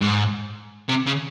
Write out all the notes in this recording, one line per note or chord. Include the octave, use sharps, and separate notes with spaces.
G#2
C3
C#3